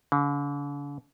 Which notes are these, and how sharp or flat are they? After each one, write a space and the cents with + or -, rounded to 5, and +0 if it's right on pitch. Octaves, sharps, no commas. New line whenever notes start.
D3 -45